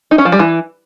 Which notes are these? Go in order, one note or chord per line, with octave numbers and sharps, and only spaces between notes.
D#4
C#4
F3
G3
E3